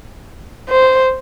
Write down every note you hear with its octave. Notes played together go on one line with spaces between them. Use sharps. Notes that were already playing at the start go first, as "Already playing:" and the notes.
C5